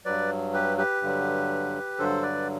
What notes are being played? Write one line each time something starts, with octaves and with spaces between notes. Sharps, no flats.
G2 F#3 B4 D5
G4 B4
G4 B4
G2 D3 F#3
G2 D3 F#3 A4 C5
B4 D5